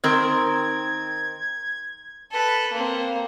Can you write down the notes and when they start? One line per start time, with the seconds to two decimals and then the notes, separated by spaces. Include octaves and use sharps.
0.04 D#3 C4 A#4 G#6
2.32 A4 B4
2.73 A#3 C4